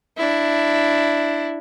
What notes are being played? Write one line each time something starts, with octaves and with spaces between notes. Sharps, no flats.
D4 E4